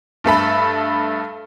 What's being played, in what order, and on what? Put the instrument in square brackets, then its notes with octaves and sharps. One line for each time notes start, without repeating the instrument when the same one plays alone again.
[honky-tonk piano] G2 A3 A4 B5